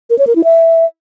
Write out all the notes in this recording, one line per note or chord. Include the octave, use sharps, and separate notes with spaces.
A#4
C#5
A#4
E4
E5